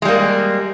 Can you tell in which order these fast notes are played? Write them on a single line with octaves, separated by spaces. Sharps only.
G#3 G3 A#3